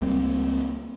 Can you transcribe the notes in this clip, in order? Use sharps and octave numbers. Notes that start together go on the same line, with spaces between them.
C#2 G3 A#3 C4